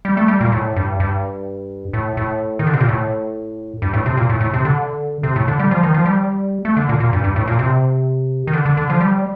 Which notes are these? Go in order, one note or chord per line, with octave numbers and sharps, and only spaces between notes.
G3
A3
G3
A#2
A2
G2
G2
A2
A2
D#3
D3
C3
A#2
A2
G2
A2
C3
A#2
A2
A2
C3
D3
C3
A2
D3
G3
F3
D#3
F3
G3
A3
D3
A#2
A#2
G2
G2
A2
A#2
C3
D#3
D3
D3
D3
F3
G3